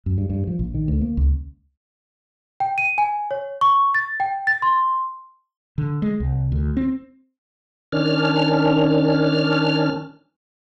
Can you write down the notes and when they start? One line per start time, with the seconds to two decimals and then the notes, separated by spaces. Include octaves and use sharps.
0.06 F#2
0.18 G2
0.30 G2
0.47 F3
0.59 A#1
0.74 D#3
0.88 D2
1.01 A#3
1.17 C#2
2.60 G5
2.78 D#7
2.98 G#5
3.31 C#5
3.61 C#6
3.95 A6
4.20 G5
4.47 A6
4.62 C6
5.78 D3
6.02 G#3
6.20 C2
6.52 D2
6.77 C4
7.92 D#3 C#4 D4 F6